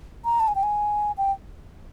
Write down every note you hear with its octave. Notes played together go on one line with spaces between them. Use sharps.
A#5
A5
G#5
G5
G#5
G5